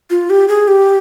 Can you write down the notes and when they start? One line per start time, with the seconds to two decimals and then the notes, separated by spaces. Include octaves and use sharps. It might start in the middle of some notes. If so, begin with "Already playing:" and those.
0.10 F4
0.30 G4
0.48 G#4
0.68 G4